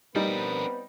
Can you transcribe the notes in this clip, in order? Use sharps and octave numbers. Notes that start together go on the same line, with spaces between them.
G3 B3 C4 D4 D#4 A#4 B4